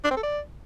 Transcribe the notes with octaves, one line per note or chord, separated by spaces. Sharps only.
D4
C4
A4
D5